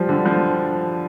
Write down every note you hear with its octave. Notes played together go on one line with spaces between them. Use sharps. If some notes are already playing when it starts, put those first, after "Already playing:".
Already playing: F3 G3
D3
F3